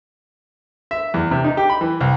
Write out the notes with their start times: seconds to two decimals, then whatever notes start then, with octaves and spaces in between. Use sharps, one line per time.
0.91 E5
1.14 E2
1.31 C3
1.44 D#4
1.57 G4
1.69 B5
1.81 E3
2.01 C2